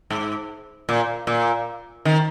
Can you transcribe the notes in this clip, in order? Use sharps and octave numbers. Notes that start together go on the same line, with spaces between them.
G#2
A#2
A#2
D#3